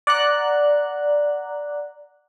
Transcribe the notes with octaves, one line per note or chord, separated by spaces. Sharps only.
D5 F#5 A#5 F#6